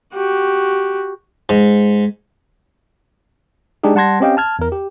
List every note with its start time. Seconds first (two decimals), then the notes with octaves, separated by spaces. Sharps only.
0.14 F#4 G4
1.49 G#2
3.83 G#3 D4 D#4 G4 G#4
3.95 G3 F#5 A5 C6 G#6 A#6
4.20 C4 C#4 G4 D#5 F5 G5
4.37 A5 F6 G#6
4.59 E2 A#4
4.72 G4